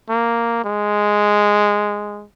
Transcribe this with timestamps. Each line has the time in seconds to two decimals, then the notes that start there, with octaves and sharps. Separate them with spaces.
0.09 A#3
0.64 G#3